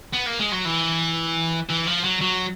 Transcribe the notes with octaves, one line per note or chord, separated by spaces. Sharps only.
B3
A#3
G#3
F#3
E3
E3
F3
F#3
F#3